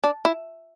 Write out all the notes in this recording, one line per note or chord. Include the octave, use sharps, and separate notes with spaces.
D4
E4